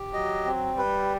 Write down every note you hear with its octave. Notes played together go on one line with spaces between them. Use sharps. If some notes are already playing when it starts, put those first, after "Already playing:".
Already playing: G4
F#3 D#5
C4
G3 B4